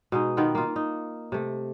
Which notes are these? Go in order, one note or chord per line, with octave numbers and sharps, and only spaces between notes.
B2 G#3 D#4
D#3 B3 F4 G5
A#3 F4
D#4
C3 A3